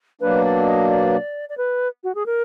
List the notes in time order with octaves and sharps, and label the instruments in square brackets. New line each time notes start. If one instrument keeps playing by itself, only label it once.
[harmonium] B2 F#3 A#3 D4 [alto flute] B4
[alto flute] D5
D#5
D5
D5
B4
F#4
G#4
A#4